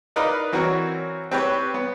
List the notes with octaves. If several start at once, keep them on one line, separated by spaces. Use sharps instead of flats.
D#4 A#4 B4 D5 D#5 F5
E3 C4 F#4 A#4 C#5
C4 G4 B4 C#5
B3